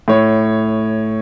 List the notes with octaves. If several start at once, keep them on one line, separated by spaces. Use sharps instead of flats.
A2 C#5